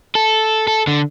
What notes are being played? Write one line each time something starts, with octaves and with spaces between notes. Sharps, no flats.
A4
A4
D3